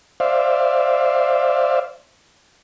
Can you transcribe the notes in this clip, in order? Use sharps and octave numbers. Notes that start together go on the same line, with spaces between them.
C5 D5 E5 F5